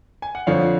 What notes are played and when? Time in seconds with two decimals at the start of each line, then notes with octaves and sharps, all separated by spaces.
0.22 G#5
0.35 F#5
0.47 F2 D3 F3 C#5 F5